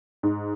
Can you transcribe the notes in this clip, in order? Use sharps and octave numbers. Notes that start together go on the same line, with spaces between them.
G#2